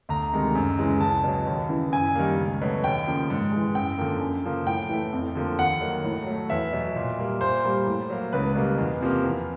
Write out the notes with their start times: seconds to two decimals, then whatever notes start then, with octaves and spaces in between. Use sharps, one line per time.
0.09 D2 A#5
0.33 C3 D#3 G#3
0.55 F#2
0.79 C#3 E3 G#3
1.00 C#2 A5
1.24 B2 F#3
1.46 D#2
1.69 C#3 E3
1.92 F#2 G#5
2.15 D#3 G3 A#3
2.38 C#2
2.62 B2 F#3 A3
2.83 D#2 G5
3.07 C#3 F3 A#3
3.30 G#2
3.52 E3 G#3
3.75 F#2 G5
3.98 D3 F3 A#3
4.21 F#2
4.44 C#3 F3 A#3
4.67 A2 G5
4.90 E3 A3
5.13 F2
5.35 D3 F3 A#3
5.58 D#2 F#5
5.81 D#3 F#3 A#3
6.04 A2
6.26 F#3 A3
6.50 E2 E5
6.73 B2 F#3
6.96 A#2
7.18 G3 A#3
7.41 A#2 C5
7.64 G3 A#3
7.87 A2
8.10 F#3 A#3
8.33 C#2 B4
8.55 B2 G3 A#3
8.78 E2
9.01 C3 F3 A#3
9.24 E2